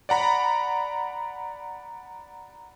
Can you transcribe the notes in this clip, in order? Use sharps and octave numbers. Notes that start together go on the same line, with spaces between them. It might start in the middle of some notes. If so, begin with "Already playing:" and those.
D5 F#5 A#5 B5